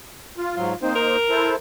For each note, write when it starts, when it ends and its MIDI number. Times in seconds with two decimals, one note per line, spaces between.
0.38 0.55 65
0.56 0.74 44
0.56 0.74 54
0.56 0.75 65
0.82 1.16 58
0.82 0.90 60
0.82 1.16 63
0.82 1.16 72
0.95 1.56 70
1.30 1.56 64
1.30 1.56 69
1.30 1.56 72